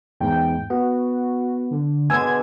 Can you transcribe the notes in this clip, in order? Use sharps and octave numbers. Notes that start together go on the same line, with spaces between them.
E2 G#2 G5
B3 F#4
D3
B2 D3 G#3 G#5 E6 G#6